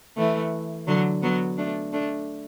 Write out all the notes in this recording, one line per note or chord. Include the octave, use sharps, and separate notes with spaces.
E3 A3
D3 F#3
F#3 B3
A3 D4
A3 D4